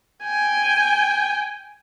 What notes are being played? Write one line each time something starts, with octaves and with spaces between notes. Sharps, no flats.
G5 G#5